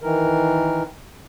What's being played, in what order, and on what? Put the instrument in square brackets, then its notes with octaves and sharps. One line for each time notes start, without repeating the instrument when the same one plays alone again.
[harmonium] D#3 E3 A#4